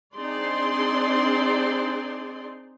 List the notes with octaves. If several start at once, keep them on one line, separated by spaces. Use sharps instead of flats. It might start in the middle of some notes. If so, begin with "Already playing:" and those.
C4 D4 D#4 G#4 D5 C6